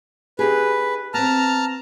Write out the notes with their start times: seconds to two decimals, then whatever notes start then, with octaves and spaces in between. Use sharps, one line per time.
0.39 D#4 G4 G#4 B4
1.14 B3 C4 A5 A#5 F6